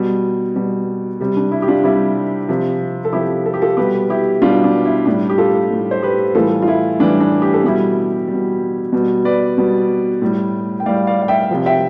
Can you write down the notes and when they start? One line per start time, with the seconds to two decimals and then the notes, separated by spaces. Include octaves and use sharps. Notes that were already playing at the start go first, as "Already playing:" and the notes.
Already playing: B2 G3
0.56 B2 G3
1.20 C3 G3
1.37 D4
1.52 E4
1.62 G4
1.68 D4 F4
1.84 C3 G3 E4
2.49 C3 F3
3.05 A4
3.13 C3 F3 E4 G4
3.46 A4
3.54 G4
3.62 F4 A4
3.77 B2 G3 G4 B4
4.10 E4 G4
4.42 B2 G3 D4 F4
4.64 D4
4.85 E4
5.06 A2 G3 D4
5.30 G4
5.38 F4 A4
5.71 A2 G3
5.91 C5
6.03 G4 B4
6.35 A2 E3 G3 F4 A4
6.62 F4
6.68 E4
6.99 A2 E3 G3 D4
7.21 D4
7.42 G4
7.54 A4
7.64 B2 G3 E4 G4
8.28 G3
8.33 B2
8.92 B2 G3
9.25 B4 D5
9.58 B2 G3
10.22 A2 G3
10.80 G5
10.86 A2 G3 D5 F5
11.07 D5 F5
11.22 F5
11.28 E5 G5
11.51 C3 F3
11.66 E5 G5